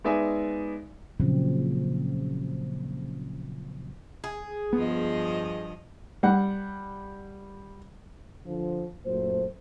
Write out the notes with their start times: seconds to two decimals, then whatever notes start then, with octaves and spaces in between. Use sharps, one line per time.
0.04 G#3 B3 D#4 D5 E5 G#5
1.20 A#2 C#3 F3 F#3 C4
4.24 G#4
4.73 G2 F3 B3 D#5
6.23 G3 F#5
8.46 D3 F3
9.06 F#2 A#2 F#3 A3 C5